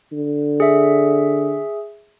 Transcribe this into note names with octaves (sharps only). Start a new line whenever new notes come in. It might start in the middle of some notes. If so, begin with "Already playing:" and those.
D3
G#4 E5